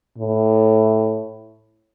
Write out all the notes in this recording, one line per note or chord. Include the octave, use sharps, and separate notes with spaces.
A2